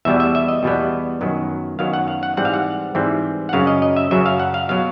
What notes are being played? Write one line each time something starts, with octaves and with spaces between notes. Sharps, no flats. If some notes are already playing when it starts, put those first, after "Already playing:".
E2 B2 G3 B3 E5
E5
E5
D#5
E2 B2 G3 B3
F#2 D#3 F#3 B3
F#2 D#3 F#3 B3 F5
F#5
F5
F#5
G#2 E3 G3 C4 F#5
F5
F#5
G#2 E3 G3 C4
F#5
F#2 C#3 F#3 F5
D#5
D#5
E5
F#2 C#3 F#3 E5
F5
F#5
F5
B2 F#3 F5